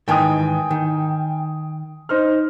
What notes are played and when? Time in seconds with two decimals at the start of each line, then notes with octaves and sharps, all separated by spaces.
0.08 G#2 D#3 E3 G5 G#5 D#6
0.71 D#3
2.09 D#4 C5 F6